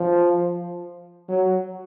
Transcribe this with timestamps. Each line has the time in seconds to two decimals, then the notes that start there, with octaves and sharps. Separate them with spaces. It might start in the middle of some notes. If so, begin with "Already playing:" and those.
Already playing: F3
1.29 F#3